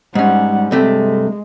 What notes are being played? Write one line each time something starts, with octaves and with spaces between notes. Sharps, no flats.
G#2 G3 C#4 F#5
G2 C3 G#3 A3